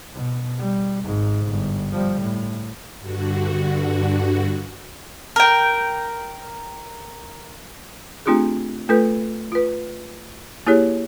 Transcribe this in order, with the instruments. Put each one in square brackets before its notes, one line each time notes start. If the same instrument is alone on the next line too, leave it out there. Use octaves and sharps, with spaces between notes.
[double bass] B2
G3
G#1 G#2
G1
F3 G3
A2
[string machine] G2 D3 F#4
[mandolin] A#4 G5
[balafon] A3 C4 D4 F4 G4 G#4
A3 F4 A4 B4
F4 B4
A#3 E4 G4 G#4 C#5